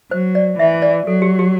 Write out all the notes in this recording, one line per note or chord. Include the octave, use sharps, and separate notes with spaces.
F#3 C5
D5
E3 E5
D5
F#3 A4
G4
G4